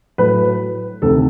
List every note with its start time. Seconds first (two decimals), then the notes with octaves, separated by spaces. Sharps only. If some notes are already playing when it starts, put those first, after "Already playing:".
0.18 A2 F#3 A3 B4
1.02 D2 C3 D#3 A4